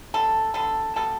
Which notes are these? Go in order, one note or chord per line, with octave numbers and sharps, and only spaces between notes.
D3 G3 B3 A4
D3 G3 B3 A4
B2 G3 B3 A4